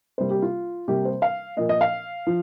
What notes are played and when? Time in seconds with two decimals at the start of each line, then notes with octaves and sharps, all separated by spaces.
0.18 C3 G3 A#3 C5
0.31 G4
0.42 F4
0.88 C3 G3 A#3 G4
1.05 C5
1.22 F5
1.57 A#2 F3 A#3 D#5
1.69 D#5
1.81 F5
2.27 F3